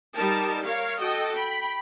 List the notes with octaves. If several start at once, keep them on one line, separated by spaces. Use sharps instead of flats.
G3 D#4 A#4 A5
A#4 C#5 F5
F#4 A4 D#5 G5
G5 B5